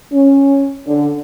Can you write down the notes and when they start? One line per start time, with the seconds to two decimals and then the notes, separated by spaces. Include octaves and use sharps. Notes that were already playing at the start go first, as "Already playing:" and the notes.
0.12 C#4
0.87 D3